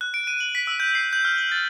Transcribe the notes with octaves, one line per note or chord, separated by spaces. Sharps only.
F#6
D7
D#7
F#7
B6
E6
G6
C7
G6
F6
F#7
A6